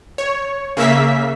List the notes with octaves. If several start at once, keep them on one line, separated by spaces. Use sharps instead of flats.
C#5
C#3 A#3 E5 B6